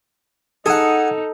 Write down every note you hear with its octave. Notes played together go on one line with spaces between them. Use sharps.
D#4 G#4 A4 F#5